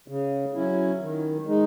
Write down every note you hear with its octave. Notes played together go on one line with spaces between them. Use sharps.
C#3
F#3 C#4 E4
D#3
G#3 D#4